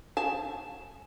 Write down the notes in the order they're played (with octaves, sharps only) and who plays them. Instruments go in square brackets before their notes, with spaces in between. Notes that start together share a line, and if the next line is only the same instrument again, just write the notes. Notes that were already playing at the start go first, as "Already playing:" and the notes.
[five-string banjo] G#5 A5